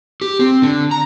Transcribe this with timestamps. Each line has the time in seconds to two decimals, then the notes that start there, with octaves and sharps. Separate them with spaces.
0.21 G4
0.39 C4
0.62 D3
0.91 A#5